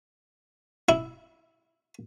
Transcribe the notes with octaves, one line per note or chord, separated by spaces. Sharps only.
E4